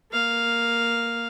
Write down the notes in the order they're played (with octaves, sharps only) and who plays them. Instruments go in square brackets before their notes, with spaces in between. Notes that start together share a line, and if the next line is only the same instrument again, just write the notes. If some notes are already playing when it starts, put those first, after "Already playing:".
[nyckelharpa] A#3 F5